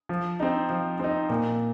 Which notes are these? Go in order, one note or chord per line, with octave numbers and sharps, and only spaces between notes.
F3
C4 D#4
F3
C4 D#4
A#2